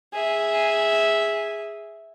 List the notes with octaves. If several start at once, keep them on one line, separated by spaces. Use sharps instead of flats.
G#4 E5